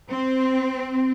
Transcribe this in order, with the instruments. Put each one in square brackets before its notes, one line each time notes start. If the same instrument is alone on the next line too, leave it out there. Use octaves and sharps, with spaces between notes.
[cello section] C4